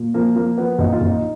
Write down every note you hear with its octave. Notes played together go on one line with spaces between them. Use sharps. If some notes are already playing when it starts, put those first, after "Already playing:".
Already playing: A#2
F3 A#3
F3 A#3
F3 B3
A#1 D#4
F4
A#1
D#4